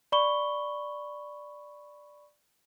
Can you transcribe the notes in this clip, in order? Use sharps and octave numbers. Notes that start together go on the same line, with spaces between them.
D5 B5 C#6 G7